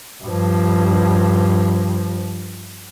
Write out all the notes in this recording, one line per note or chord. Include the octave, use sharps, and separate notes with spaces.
G2 F3